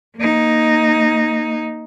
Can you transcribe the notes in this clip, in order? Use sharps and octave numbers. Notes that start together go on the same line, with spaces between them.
A#3 D#4